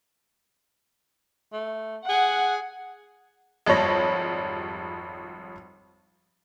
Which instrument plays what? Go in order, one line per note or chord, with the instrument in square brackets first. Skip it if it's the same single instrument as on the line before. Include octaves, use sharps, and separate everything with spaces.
[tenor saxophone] A3
[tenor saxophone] G#4 [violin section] F#5
[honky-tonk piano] G#1 F2 G3 C#5 A#6